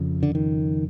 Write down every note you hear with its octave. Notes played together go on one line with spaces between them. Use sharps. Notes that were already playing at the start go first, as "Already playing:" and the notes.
Already playing: F2 C#3
D3
D#3